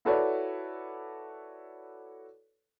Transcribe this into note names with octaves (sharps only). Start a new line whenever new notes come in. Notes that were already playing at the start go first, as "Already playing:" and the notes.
E4 F#4 A4 B4 C#5 D5